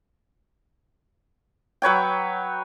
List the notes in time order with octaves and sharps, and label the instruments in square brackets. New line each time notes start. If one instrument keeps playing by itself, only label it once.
[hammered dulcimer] F#3 B4 C#5 G5